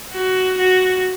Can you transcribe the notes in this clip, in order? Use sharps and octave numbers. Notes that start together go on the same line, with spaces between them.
F#4
F#4